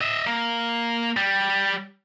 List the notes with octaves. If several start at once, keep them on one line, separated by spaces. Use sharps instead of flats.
D#5 E5
A#3
G3